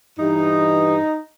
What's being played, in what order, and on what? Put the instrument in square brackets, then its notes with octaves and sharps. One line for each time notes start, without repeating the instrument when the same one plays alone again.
[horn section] G2 E3 D#4